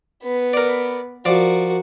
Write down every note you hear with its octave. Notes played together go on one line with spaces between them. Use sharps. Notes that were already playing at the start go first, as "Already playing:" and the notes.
B3 B4
A#4 D5
F3 F#4 A#4 D5